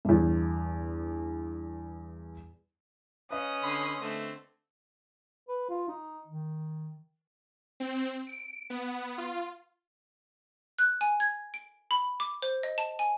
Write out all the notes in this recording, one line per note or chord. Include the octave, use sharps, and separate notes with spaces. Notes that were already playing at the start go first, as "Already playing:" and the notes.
E2 G2
C#4 B4 D#5 F5 D#6
D3 B5 C6
D3 A3 C4
B4
F4
D#4
D#3
C4
D7
B3
F4
F#6
G#5
G#6
D7
B5
D6
C5
D#5
A5
G#5